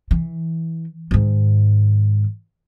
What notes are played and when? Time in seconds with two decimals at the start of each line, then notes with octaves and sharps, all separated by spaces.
0.11 E3
1.11 G#2 D#3